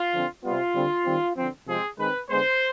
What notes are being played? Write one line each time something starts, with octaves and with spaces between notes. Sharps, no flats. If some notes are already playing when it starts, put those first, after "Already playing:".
Already playing: F4
D3 F3 C4
C3 G3 B3 F4
D3 G3 C4
D#3 G3 C4
D3 F3 C4
C3 F3 G#3 C4 G#4
D#3 G#3 C4 B4
D3 G#3 B3 C5